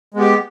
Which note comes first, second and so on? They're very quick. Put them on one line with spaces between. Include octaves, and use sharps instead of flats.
G#3 B3 G4